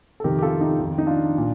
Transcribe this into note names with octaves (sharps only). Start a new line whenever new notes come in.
A4
F2 C3 D#3 G4 A#4
G4
F4 A4
D#4 G4
F2 D#3
D#4
D4 F4
A#2